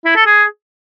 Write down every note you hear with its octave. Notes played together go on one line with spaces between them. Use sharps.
E4
A4
G#4